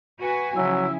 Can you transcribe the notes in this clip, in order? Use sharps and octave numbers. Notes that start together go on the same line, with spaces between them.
F#4 B4 G#5
C#3 F3 F#3 E4 E6